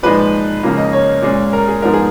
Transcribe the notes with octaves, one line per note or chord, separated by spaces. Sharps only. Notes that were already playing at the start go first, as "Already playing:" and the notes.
A#2 F3 G#3 D#4 B4
C#2 C#3 F3 A#3
D#5
C#5
A#2 G#3 C#4
A#4
G#4
G#2 F3 B3 D#4 A#4
G#4